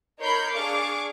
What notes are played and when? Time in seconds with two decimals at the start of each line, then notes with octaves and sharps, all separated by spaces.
0.22 D#4 A#4 C#5 B5 G6 C7
0.53 D4 G#4 F5 C#6 D6